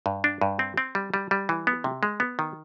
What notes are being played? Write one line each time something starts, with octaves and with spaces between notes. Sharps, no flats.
G2
D4
G2
C4
C4
G3
G3
G3
E3
B3
C3
G#3
B3
D#3